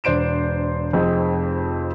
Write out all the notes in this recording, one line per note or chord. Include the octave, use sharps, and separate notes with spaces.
E1 D4 C5 D7 E7
F1 F2 C4 G#4 D#5